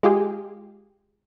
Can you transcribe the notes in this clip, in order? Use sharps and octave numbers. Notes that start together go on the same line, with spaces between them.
G#3 F4 G4 G#4